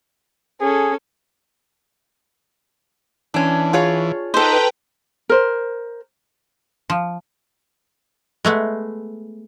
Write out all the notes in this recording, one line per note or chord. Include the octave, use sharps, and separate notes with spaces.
C#4 G#4 A4
E3 C#4 D4
F4 G#4 C#5
D#4 A4 B4 C5 G5 A#5
A#4 C5
F3
G#3 A3 B3